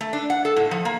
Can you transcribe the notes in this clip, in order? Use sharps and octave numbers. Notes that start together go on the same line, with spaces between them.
A3
D4
F#5
A4
A2
F3
A#3